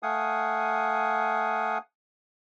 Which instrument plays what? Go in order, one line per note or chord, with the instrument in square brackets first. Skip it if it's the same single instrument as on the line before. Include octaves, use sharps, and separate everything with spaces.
[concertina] A3 F5 F#5 G#5 D#6